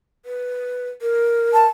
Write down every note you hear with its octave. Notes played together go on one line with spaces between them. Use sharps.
B4
A#4
A5